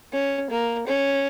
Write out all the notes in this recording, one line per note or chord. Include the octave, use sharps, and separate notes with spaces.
C#4
A#3
C#4